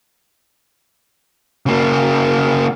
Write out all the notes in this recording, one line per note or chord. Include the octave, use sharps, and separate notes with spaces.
C#3 A#3